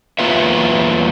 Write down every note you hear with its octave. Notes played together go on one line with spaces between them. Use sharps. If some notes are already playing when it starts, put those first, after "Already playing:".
E2 F#3 A#3 F4 B4 E5